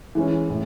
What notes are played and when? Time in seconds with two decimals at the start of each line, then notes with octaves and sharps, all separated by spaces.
0.15 E3 G#3 C#4
0.50 A2